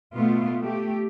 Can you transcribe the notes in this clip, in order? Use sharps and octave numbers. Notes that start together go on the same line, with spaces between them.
B2 A3 B3 F4
A3 G4